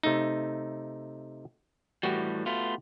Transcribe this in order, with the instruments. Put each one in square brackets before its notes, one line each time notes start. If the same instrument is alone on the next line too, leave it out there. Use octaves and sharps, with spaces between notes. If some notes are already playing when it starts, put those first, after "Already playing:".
[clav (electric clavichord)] C3 A3 D#4
[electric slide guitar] A2 E3 G3 [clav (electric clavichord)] F#4 G4
[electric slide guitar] A3 B3 F4